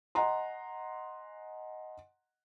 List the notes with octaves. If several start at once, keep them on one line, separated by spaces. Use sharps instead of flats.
D#5 F#5 G#5 A#5 C6